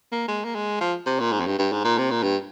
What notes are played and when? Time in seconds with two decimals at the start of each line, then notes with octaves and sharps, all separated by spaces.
0.12 A#3
0.28 G#3
0.44 A#3
0.55 G#3
0.80 F3
1.06 C3
1.20 A#2
1.32 G#2
1.40 F2
1.46 G2
1.59 G2
1.72 G#2
1.84 A#2
1.98 C3
2.11 A#2
2.23 G2